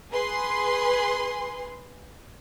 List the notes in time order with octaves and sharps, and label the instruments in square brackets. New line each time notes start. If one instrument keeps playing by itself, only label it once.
[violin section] G#4 B4 C6